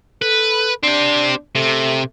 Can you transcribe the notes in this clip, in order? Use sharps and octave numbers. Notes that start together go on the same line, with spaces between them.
A4 B4
C4 D4 G4
C3 A3